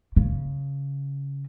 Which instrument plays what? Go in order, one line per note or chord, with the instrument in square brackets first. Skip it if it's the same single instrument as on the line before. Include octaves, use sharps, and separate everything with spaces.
[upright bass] C#3